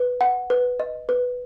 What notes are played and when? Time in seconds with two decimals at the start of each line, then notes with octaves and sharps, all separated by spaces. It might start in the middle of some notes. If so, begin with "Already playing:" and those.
Already playing: B4
0.21 F#5
0.50 B4
0.80 D#5
1.09 B4